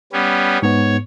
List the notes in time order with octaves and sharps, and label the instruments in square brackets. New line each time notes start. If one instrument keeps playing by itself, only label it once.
[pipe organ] G3 B3 C#4
[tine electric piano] G#2 B3 [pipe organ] C#5